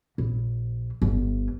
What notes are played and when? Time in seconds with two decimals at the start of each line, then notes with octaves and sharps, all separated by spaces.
0.18 A#1
1.02 G1